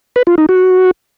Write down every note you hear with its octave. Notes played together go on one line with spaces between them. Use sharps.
B4
F4
D#4
F#4